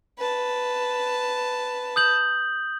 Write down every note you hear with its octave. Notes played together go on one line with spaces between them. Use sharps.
B4 A5
D#6 G6 F#7